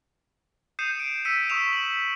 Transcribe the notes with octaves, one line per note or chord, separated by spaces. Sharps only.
D#6 G6 C7 C#7 D#7 E7
D7
E6 B6 C#7 D#7
C#6 D#6 E6 E7 F7
F#7